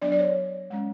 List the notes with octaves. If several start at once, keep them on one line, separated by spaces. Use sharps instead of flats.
F#3 B3 D4 D5
D5
C#5
G#3 C#4